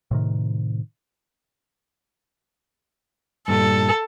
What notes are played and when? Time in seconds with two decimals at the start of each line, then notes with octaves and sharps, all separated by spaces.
0.11 A2 C3 D#3
3.48 G2 A#2 G3 A4